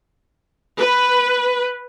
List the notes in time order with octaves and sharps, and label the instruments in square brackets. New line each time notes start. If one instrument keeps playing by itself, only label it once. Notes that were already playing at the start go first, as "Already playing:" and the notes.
[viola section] B4